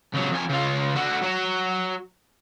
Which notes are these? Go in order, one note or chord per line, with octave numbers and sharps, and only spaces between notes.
C#2 F#3
F2 G#5
C#3 F4
D3 F#4
F#3 F#4